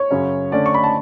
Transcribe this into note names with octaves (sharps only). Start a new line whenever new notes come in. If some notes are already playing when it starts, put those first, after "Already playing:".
Already playing: C#5
F#2 C#3 F#3 C#4
D3 A3 C#4 D5
C#6
B5
A5